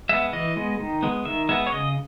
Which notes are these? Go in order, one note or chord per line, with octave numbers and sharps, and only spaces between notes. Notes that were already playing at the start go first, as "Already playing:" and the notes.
G#3 B3 E5
E3 D#5
G#3 B3
D#3
G#3 B3
D#3 E5
G#3 B3 E5
C#5
C#3 D#5